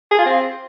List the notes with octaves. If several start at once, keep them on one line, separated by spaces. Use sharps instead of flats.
G#4
F4
C4